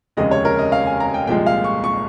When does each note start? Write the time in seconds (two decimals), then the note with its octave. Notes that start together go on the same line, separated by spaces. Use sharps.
0.17 F1 D#2 C#3 G#3 D#5
0.31 C#5
0.45 A#4
0.59 D#5
0.72 F5
0.87 G#5
1.00 A#5
1.14 G5
1.27 C2 A#2 F3 G#3 G5
1.46 F5
1.64 C#6
1.84 C#6